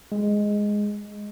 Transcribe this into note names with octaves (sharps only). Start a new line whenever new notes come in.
G#3